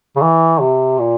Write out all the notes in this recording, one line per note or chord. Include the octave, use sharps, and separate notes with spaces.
C#3
E3
C3
A#2